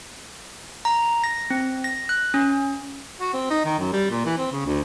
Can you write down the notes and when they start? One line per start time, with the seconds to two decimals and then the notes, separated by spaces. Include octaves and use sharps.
0.85 A#5
1.24 A#6
1.50 C4
1.84 A#6
2.09 F#6
2.34 C#4
3.21 F#4
3.34 C4
3.50 D#4
3.65 D#3
3.79 F#2
3.93 G3
4.11 A#2
4.25 E3
4.38 C4
4.52 C#3
4.65 D2